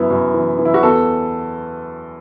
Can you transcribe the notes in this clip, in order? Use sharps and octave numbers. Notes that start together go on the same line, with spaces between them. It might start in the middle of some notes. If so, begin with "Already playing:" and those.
Already playing: F#2 E3 B3 E4
F#2
E3
E3
E4
F#4
E2 A4